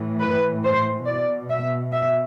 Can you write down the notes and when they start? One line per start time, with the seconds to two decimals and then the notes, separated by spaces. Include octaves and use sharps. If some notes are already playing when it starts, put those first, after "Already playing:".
Already playing: A2 E3
0.21 B4
0.64 C5
1.07 B2 D5
1.49 E5
1.93 E5